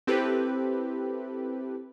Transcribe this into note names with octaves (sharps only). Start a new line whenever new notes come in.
C4 E4 G4 A4 B4